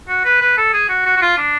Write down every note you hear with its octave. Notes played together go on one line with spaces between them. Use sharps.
F#4
B4
B4
A4
G#4
F#4
F#4
F#4
F4
D4